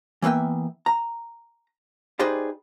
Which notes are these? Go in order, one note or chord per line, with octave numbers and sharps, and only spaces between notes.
E3 A#3 B3 E5 G5
A#5
D#4 G4 G#4 B4 C5 D5